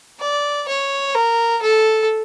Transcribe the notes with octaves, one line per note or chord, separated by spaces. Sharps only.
D5
C#5
A#4
A4